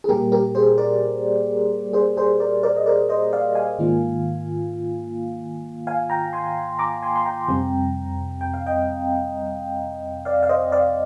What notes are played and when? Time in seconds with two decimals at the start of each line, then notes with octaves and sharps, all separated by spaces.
0.04 G#4
0.09 A#2 G3 A#3 G4 A#4
0.32 G4 A#4
0.55 G#4 C5
0.78 A#4 D5
1.93 G#4 C5
2.17 G#4 C5
2.40 A#4 D5
2.63 A#4 D5
2.76 D#5
2.86 A#4 D5
3.09 C5 D#5
3.33 D5 F5
3.55 F5 G#5
3.78 G#2 D#3 A#3 F4
5.87 F5 G#5
6.10 G5 A#5
6.33 G#5 C6
6.79 A#5 D6
7.02 G#5 C6
7.16 C6
7.26 G5 A#5
7.48 F2 C3 G3 C4
8.41 G5
8.54 F5
8.66 D#5 G5
10.25 D5 F5
10.43 F5
10.49 C5 D#5
10.72 D5 F5